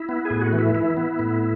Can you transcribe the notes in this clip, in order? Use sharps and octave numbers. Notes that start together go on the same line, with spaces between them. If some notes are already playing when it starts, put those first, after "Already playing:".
Already playing: E4
B3
G#4
A2
F#4
E3
E4
E4
B3
A2